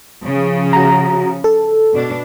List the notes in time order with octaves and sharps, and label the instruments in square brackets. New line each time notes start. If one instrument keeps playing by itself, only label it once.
[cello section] C#3 F3
[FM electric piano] F#4 A#5
A4
[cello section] B2 D4